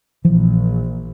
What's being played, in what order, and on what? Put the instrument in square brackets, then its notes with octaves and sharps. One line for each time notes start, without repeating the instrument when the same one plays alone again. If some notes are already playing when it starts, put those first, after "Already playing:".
[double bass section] A#1 [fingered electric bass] E3 F3